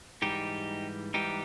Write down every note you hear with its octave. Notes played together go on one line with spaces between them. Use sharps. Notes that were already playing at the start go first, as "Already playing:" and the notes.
G#2 E3 G3 D#4 G4
G#2 E3 G3 D#4 G4